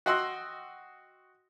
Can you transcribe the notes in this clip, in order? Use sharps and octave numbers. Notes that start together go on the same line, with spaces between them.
F#4 D#5 F#5 G5 C6 E6